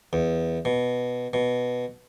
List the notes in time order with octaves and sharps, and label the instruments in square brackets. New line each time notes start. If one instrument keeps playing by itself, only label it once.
[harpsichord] E2
B2
B2